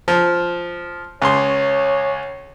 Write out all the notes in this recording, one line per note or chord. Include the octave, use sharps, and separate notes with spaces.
F3
C#2 C#5 C6